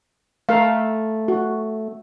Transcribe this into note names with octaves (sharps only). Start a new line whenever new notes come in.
A3 A#4 F5
F#4